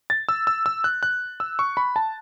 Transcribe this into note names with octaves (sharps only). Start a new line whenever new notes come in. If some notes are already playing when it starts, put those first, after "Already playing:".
A6
E6
E6
E6
F#6
F#6
E6
C#6
B5
A5